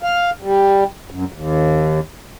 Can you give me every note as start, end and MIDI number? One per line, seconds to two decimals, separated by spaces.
0.03 0.30 77
0.42 0.84 55
1.11 1.25 42
1.33 2.00 39